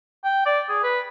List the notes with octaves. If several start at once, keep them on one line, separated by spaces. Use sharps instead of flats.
G5
D5
G#4
B4